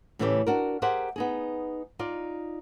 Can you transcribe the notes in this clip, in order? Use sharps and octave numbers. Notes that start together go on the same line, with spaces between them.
A2 C#3 E3 A3 C#4 G4
D4 F#4 A#4
G4 G#4 A#4 C5 E5 F#5
B3 D#4 G#4
D#4 F4 D5